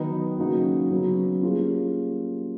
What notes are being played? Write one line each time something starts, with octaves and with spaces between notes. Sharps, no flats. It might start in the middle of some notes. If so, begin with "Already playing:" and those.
Already playing: D#3 F#3 B3 D#4
C#3 F#3 A#3 D#4 F#4
C#3 F#3 B3
G3 A#3 C#4 F4 G#4